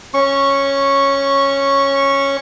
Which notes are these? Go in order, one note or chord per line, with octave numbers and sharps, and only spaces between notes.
C#4 C#6